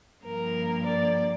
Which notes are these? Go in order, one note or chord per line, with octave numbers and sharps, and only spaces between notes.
G2 F3 A#3 A#4
D5